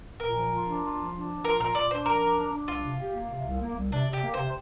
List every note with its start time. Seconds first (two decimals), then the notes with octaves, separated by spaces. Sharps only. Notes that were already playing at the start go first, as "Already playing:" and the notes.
0.20 A#2 A#4
0.36 F3
0.52 F4
0.67 D4
0.82 F4
0.98 F3
1.13 D4
1.29 F3
1.44 F4 A#4
1.60 A#2 A#4
1.75 A#2 D5
1.91 D4 C5
2.06 F3 A#4
2.22 D4
2.38 D4
2.52 D4
2.68 C2 F4
2.84 C3
3.00 G4
3.15 A#3
3.30 C3
3.45 C2
3.61 A#3
3.76 C2
3.92 C3 D4
4.07 C3
4.13 G4
4.24 A#3
4.34 C3 C5